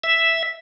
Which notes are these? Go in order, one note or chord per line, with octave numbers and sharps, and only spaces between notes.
E5